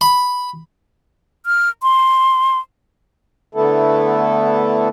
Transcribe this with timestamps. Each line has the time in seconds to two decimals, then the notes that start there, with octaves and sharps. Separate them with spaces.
0.01 B5
1.46 F6
1.83 C6
3.55 D3 A3 B3 E4 A4